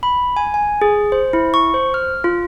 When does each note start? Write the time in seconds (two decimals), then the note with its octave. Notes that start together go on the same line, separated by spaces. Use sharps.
0.03 B5
0.36 G#5
0.54 G#5
0.82 G#4
1.12 C5
1.33 E4
1.54 C#6
1.74 C5
1.94 F6
2.24 F4